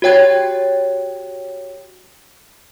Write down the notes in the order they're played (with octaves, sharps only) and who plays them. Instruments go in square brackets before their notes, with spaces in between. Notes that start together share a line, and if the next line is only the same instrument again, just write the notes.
[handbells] F#4 G4 C#5 G5 G#6 A6